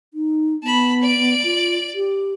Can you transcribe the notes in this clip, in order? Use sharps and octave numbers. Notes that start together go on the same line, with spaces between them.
D#4
B3 A5 B5
D5 D7
F4
G4